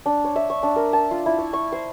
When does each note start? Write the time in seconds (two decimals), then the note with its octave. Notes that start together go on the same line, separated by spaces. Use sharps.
0.06 D4
0.24 C#5
0.36 E5
0.50 C#6
0.63 D4
0.76 A#4
0.93 A5
1.11 F4
1.26 E4
1.38 C#6
1.53 C#6
1.72 C5